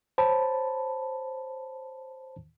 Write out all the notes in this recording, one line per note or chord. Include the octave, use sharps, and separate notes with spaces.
C5 C#5 A5 B5